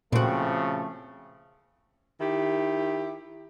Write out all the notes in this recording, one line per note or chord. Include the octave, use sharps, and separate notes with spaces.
A#2 C#3 F3 A3 C4 F#4
D#3 E4 G4